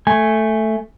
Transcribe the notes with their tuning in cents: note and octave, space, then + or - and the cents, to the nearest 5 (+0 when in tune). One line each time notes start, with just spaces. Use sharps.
A3 +0 G#5 +0